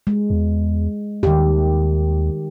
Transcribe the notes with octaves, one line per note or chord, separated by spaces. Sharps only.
G#3
E2
D#2 D#3 G4